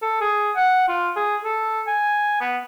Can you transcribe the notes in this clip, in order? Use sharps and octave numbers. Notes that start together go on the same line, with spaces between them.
A4
G#4
F#5
F4
G#4
A4
G#5
B3